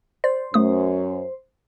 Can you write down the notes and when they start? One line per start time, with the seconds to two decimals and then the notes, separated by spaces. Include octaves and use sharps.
0.24 C5 D5
0.54 F#2 A3 C#4 D#6